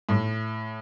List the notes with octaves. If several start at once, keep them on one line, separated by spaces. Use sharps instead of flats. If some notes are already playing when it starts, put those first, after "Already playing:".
A2